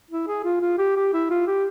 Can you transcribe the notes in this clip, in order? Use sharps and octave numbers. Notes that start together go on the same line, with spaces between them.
E4
G#4
F4
F4
G4
G4
E4
F4
G4